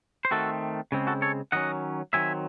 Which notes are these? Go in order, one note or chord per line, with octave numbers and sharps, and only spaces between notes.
C5
D#3 A3 C4 F#4 A4
C#3 G#3 C4
F#4 A4
A4 C#5
D#3 F#3 C#4 D#5 F#5
D#3 F#3 C4 E5 G#5